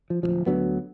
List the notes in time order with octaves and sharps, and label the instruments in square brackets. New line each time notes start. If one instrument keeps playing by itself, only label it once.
[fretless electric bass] F3
D1 C2 F3
D2 D3 F#3 B3